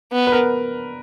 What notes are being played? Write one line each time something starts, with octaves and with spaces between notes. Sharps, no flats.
B3
B4
A#4